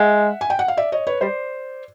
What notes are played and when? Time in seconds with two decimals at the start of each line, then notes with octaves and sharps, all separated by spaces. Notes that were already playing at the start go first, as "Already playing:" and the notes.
Already playing: G#3 E5 F#5
0.41 G#5
0.50 G5
0.59 F#5
0.68 F5
0.77 D5 E5
0.92 C#5 D#5
1.07 B4 C#5
1.21 G3 C5 D5